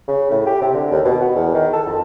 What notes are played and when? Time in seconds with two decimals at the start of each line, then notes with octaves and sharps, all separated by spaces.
0.08 C#3
0.30 A2
0.47 G4
0.62 C3
0.74 D3
0.91 D#2
1.05 B2
1.22 B3
1.35 E2
1.54 D#3
1.73 A4
1.87 F2